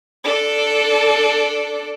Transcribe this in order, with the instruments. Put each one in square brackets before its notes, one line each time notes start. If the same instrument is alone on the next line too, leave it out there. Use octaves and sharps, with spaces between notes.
[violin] D4 A4